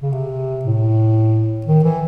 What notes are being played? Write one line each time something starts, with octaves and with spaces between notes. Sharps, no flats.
C#3
C3
A2
D#3
E3